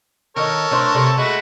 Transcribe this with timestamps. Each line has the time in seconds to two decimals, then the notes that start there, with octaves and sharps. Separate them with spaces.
0.36 D#3 A4 A#4 C#5 D#5
0.71 A3 D4 C5
0.95 C3 A3 D5
1.17 G#3 A3 F#4 B5